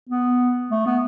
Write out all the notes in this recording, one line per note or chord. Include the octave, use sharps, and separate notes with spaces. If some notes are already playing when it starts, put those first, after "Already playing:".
B3
A3
B3